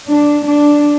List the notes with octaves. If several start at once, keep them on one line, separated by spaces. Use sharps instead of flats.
D4
D4